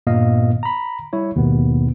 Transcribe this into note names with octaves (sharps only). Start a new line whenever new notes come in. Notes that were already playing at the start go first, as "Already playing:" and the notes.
G2 A#2 A#3 B3 D#5 F5
A#5 B5
G3 E4 C#5
D#2 G#2 B2 B3